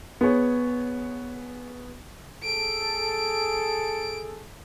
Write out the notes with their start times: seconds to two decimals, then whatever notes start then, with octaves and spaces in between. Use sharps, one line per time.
0.21 B3 G#4 C#5
2.43 G#4 A4 D7